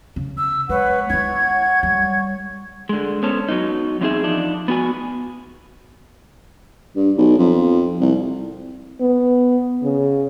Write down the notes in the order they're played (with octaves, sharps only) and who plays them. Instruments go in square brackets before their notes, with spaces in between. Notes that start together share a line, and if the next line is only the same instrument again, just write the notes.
[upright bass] C#3
[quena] E6
[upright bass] G#3 [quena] B4 [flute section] C#5 F#5 C#6
[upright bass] D#4 E4 [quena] G#6
[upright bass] G3
[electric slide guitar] D3 G#3
B3 C#4 A4 C5
F#3 B3 D#4
E3 F#3 C4 D#4 G#4 E5
F3 D4 D#4
B3 F#4 G#5
[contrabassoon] G2
B1
F2
C2
[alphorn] B3
C#3